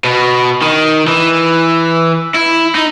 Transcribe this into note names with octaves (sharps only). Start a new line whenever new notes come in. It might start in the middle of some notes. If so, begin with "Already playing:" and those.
B2
D#3
E3
E4
D#4